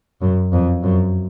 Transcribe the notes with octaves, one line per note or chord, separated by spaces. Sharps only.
F#2
F2
F#2